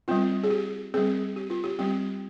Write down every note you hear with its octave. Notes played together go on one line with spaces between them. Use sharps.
G3 C4 F4
G#4
G4
G3 C4 G#4
G4
F4
G4
G3 C4 G4